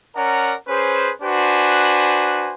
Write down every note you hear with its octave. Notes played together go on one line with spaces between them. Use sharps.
C#4 A#4 D5 F#5 A#5
C#4 G#4 B4 C5
D4 F#4 B4 C5 G#5